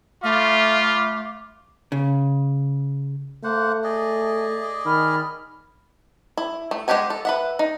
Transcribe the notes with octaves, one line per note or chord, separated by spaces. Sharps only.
A3 F4 F5 B5 D6
C#3
A3 A#3 C5 F#5
G#4 D5 D#5
D#3 B5 F6
E4
A3
G#3 F#4 G4 F#5 G#5
A4
B4 E5 F#5
D#4